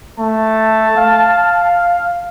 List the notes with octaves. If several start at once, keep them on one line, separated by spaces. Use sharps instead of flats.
A3 A5
F5